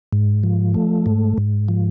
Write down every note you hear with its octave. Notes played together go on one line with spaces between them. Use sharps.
G#2
F3
A3
G#2
G#2
F3